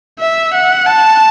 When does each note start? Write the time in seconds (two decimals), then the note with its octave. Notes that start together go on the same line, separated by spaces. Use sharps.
0.20 E5
0.54 F#5
0.87 A5